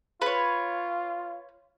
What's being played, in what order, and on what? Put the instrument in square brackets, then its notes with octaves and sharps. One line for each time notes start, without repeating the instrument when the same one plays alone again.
[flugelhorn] F4 [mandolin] B4 C#5